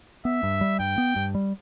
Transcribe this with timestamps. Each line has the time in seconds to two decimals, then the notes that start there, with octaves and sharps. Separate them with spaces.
0.25 B3 E5
0.43 G2
0.61 G3
0.80 G2 G5
0.98 B3
1.16 G2
1.35 G3